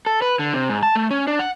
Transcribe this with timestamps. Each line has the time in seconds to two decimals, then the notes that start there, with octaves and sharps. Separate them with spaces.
0.06 A4
0.22 B4
0.39 D3
0.54 C3
0.69 G#2
0.83 A5
0.95 A3
1.11 C#4
1.27 D4
1.39 F#5